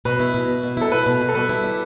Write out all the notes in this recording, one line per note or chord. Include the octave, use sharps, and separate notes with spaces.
B2 B4
E4
B2
E4
B2
E4 A4
B2 B4
B2
B2
A4
G3 B4
E4
G3